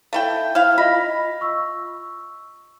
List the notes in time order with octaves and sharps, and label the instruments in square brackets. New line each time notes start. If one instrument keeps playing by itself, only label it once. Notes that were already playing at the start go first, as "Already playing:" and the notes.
[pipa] A3 E4 G5 [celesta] F5
[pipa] E4 F5 [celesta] F6
[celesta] F4 D#5 A#6 [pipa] B5
[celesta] C#6 E6